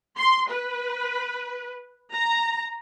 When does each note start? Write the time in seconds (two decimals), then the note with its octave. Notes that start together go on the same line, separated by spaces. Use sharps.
0.17 C6
0.50 B4
2.11 A#5